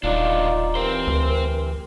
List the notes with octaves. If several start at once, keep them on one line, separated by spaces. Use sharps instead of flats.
D#1 B1 D4 D#4 F4 D5 F5
E3 C4 G4 A#4 C5
D2